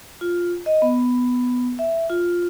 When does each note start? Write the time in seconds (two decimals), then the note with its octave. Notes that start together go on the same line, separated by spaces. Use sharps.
0.21 F4
0.66 D#5
0.82 B3
1.79 E5
2.09 F4